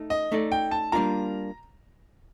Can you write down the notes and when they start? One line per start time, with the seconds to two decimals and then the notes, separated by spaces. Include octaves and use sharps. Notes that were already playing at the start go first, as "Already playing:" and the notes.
Already playing: A3 D#4
0.10 D#5
0.32 A3 D#4 A4 D5
0.52 G5
0.71 A5
0.92 G3 A#3 D4 F4 A#4 A#5